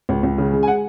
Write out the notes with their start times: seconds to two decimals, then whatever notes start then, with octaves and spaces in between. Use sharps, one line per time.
0.09 C#2
0.23 C#2
0.38 C#3
0.53 G#3
0.63 G#5
0.68 F#5